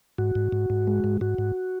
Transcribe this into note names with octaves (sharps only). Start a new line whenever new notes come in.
G#2 F#4
G#2
G#2
G#2
G#3
G#2
G#2 F#4
G#2